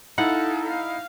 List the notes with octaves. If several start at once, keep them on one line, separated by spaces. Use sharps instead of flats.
D#4 E4 A4 F5 F#5
F5